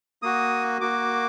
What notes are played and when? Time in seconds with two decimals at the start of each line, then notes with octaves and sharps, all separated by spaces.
0.22 A#3 F#4 D#6
0.81 A#3 F#4 D6